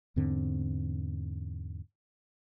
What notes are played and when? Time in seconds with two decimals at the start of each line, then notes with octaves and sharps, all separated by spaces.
0.16 E2 G#2 D3 C4